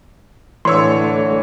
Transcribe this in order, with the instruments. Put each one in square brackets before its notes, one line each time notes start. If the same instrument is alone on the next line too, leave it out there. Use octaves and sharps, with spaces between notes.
[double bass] A2 D3 [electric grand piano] E3 C#5 [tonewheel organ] A3 [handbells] C6 E6